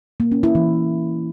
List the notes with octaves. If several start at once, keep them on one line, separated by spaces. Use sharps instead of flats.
A#3
C#4
E4
E3